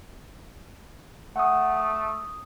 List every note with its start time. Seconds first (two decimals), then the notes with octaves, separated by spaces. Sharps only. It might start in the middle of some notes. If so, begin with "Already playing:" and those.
1.36 A3 F#5 D#6
1.77 D#6